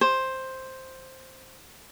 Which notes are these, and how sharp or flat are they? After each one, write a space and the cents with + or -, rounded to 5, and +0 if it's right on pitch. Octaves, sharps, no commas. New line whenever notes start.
C5 +5